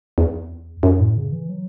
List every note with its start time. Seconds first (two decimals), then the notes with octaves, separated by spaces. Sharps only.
0.18 E2
0.83 F#2
1.00 A2
1.17 C#3
1.32 E3
1.49 F#3